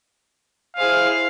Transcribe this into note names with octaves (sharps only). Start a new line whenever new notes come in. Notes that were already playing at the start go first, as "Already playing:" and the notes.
E4 G#4 C5 F5